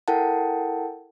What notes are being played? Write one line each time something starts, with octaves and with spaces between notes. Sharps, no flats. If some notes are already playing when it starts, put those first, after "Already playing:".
E4 A4 A#4 F#5 G5 A5